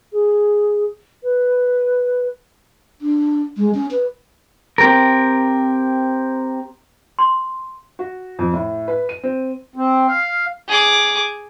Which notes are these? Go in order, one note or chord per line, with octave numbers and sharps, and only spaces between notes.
G#4
B4
D4
G#3
C#4
B4
C4 G4 A#4
C6
F#4
F2
A2
B4
D#7
C4
C4
F5
G#4 D6